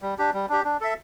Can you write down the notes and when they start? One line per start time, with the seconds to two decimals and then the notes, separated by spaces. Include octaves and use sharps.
0.02 G3
0.18 D4 G4
0.33 G3
0.49 D4 G4
0.65 D4
0.81 A4 E5